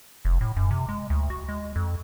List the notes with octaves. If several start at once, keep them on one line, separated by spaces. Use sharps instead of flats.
F1
A2
F#2
C3
G#3
D2
F#4
G#3
F2